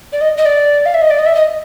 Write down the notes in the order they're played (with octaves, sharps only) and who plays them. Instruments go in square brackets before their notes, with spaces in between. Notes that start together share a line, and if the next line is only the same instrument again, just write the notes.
[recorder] D5
D#5
D#5
D5
F5
E5
D#5
D5
D#5
E5
D#5